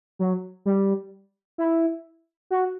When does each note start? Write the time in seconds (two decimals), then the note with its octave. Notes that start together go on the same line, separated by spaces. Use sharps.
0.19 F#3
0.66 G3
1.58 E4
2.51 F#4